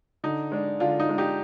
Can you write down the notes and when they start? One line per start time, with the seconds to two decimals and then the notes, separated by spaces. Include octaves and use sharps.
0.24 D3 D#4
0.52 G#3 D4
0.80 D3 D4 F4
1.00 D#4
1.09 G#3 D4
1.18 D#4 G4